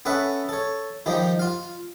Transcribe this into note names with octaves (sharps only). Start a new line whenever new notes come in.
B3 C#4 A4 B4 E5
A4 C#5
D#3 F3 G3 D#4
F4 F5